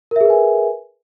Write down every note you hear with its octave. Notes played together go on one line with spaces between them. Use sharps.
G#4 A#4 B4 E5 G#5